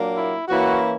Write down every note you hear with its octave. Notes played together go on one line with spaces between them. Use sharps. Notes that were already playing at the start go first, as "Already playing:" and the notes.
Already playing: A#2 F#3 A#3 D4
E4
E3 A#3 C#4 E4 F#4